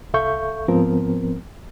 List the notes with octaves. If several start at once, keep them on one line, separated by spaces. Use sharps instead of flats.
C2 A4 E5 F5 C#6 G6
G#2 F3 B3 C4 A#4